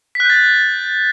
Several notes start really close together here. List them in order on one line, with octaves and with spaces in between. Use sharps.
B6 F#6 G6 A6